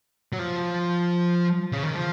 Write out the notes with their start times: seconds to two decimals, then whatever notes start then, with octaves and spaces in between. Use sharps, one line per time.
0.33 F#3
0.39 F3
1.72 C#3
1.83 D#3
1.93 F3